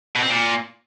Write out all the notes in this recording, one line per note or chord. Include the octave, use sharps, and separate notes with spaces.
B2
C4
A#2